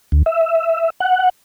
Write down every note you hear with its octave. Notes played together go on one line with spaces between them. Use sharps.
D2
E5
F#5